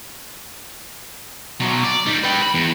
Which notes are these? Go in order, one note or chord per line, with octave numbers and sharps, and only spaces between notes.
B2 F#3
D5
G3 D#4
B4 G5
B5
E2